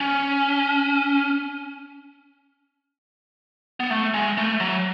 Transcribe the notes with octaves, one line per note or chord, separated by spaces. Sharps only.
C#4
B3
A3
G#3
A3
F#3